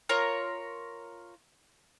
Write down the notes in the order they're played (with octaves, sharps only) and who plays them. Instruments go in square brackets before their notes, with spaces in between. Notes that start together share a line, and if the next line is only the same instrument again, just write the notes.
[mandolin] F4 A#4 C#5